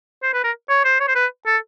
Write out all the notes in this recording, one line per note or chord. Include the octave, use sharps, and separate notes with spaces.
C5
B4
A#4
C#5
C5
C#5
C5
B4
A4